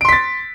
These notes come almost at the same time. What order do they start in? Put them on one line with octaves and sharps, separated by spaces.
D7 C6 B6 A6